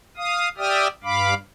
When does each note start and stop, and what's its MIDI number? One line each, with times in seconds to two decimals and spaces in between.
0.17 0.49 77
0.17 0.49 87
0.58 0.88 67
0.58 0.88 74
0.58 0.88 76
0.58 0.88 79
0.58 0.88 87
0.58 0.88 89
1.04 1.34 43
1.04 1.34 77
1.04 1.34 83
1.04 1.34 86